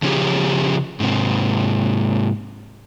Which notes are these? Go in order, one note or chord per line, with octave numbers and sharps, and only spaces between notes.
C#3 F3 C#4 E4 G4 G#4
G#2 C3